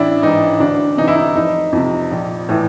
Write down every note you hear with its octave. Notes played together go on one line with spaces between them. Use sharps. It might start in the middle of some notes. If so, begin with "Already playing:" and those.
Already playing: A1 D4 E4
G#2 E3 D#4
D2 D4
C3 E3 D#4
E4
D#4
F1 D#4
F2 C3
A#1
A2 E3